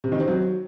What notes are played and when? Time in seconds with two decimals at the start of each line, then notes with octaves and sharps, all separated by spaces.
0.04 C3
0.12 D#3
0.20 C4
0.28 F#3